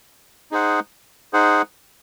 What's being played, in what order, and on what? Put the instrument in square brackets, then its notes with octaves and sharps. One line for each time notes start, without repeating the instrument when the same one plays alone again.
[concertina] D#4 G#4 C5 F#5
D#4 G#4 C5 F#5